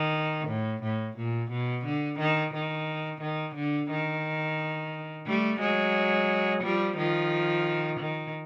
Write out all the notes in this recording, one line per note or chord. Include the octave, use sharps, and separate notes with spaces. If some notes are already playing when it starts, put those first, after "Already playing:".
Already playing: D#3
A2
A2
A#2
B2
D3
D#3
D#3
D#3
D3
D#3
G3 A3
F#3 G#3
F3 G3
D#3 F3
D#3